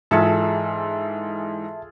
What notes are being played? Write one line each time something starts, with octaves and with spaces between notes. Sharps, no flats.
G#2 E3 F4 G#4 A4 E5 A5 C#7